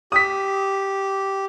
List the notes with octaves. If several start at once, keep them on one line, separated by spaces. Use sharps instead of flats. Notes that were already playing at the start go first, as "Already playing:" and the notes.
G4 D#6 B6